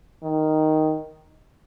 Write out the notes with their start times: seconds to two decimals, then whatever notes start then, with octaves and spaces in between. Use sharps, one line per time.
0.23 D#3